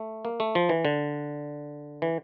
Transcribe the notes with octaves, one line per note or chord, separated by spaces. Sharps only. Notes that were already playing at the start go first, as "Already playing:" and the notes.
Already playing: A3
A#3
A3
F3
E3
D3
E3